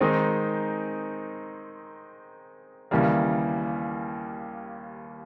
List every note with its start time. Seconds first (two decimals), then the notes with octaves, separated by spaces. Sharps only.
0.01 D#3 G#3 C4 D#4
2.91 D#2 C#3 E3 G3 A#3